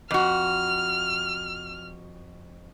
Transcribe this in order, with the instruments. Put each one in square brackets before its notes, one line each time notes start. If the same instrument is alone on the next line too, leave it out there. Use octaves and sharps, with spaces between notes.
[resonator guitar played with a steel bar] F2 F#4 [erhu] F6